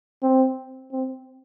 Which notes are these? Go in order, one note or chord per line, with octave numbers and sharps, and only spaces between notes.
C4
C4